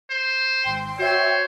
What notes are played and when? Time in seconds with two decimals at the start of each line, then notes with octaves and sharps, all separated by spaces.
0.10 C5
0.64 G#1 G5 C6
0.99 F#4 C5 C#5 E5